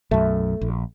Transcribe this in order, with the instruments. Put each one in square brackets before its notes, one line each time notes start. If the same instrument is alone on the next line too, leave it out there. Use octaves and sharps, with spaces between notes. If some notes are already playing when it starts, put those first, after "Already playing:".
[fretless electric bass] B1 F#2 [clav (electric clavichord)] A3
[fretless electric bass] A#1